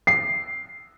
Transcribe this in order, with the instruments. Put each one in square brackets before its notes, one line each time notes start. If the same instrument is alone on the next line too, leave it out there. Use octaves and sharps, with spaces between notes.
[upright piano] C7